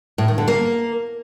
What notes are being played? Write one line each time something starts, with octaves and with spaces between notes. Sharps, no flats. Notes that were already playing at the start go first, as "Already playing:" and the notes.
A2
D#3
D3
A#3